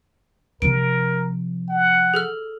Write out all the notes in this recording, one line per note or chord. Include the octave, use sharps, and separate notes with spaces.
C3 F3 A#4 D7
F#5
G#4 A4 F6